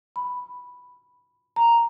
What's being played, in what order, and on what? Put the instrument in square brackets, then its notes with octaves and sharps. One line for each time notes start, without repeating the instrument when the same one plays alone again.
[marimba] B5
A#5